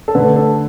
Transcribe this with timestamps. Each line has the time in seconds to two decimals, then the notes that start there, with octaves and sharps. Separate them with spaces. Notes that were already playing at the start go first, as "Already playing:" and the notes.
0.08 A4
0.15 D3 A3 B4
0.36 A4